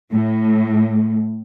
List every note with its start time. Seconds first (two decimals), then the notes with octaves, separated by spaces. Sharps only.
0.11 A2